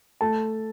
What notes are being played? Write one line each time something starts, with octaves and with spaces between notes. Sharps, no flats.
A3 A5